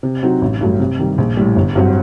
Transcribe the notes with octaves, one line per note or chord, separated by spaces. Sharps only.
C3
F#3 C4 D#4 F#4
A1
G2 F#3 A3
C3
D#3 G3
A#1
A2 G3
G1
G2 F#3 C4 F#4